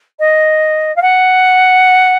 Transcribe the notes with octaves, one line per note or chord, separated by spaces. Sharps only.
D#5
F5
F#5